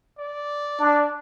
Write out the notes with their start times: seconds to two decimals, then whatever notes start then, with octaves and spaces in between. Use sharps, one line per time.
0.19 D5
0.79 D4